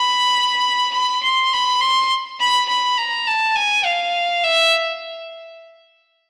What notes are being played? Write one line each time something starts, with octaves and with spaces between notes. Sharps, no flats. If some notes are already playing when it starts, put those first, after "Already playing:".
Already playing: B5
B5
C6
B5
C6
B5
B5
A#5
A5
G#5
F5
E5